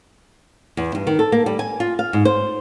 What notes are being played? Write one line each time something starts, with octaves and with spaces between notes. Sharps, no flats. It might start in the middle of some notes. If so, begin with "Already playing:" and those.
E2
G2
D#3
A4
A#3
G3
G#5
F4
F5
G#2
C5